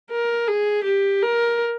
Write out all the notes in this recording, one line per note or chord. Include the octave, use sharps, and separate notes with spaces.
A#4
G#4
G4
A#4